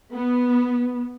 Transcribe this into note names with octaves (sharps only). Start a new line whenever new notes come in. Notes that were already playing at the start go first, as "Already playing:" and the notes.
B3